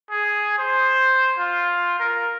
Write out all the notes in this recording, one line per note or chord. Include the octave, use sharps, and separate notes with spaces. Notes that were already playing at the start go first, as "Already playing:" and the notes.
G#4
C5
F4
A#4